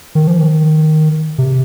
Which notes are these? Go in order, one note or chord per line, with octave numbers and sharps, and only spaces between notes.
D#3
F3
D#3
C3